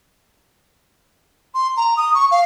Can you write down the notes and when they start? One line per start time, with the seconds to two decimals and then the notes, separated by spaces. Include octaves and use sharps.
1.54 C6
1.77 A#5
1.97 D#6
2.14 C#6
2.31 F5